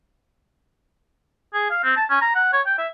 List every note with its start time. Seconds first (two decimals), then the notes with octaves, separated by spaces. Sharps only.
1.54 G#4
1.71 F5
1.84 C4
1.97 A5
2.10 C#4
2.21 A#5
2.35 F#5
2.53 C#5
2.66 G5
2.78 E5